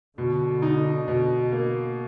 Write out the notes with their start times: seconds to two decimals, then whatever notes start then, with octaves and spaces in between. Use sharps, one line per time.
0.17 B2 D3
0.62 D#4
1.08 B2
1.52 A#3